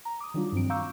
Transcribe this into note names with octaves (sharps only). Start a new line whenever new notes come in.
A#5
D6 D#6
D#3 F#3 G3 D4 F4
G2 F3 C4 D7
F5 A#5 C#6 D6 E6 G6